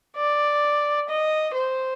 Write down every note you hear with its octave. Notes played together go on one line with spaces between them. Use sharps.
D5
D#5
C5